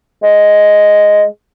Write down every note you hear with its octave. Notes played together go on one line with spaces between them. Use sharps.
G#3